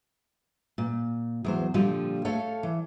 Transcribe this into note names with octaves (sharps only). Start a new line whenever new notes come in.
A#2
E2 F#3 C5
A#2 D3 F3 G3 F4
A3 A4 C#5 F5
E3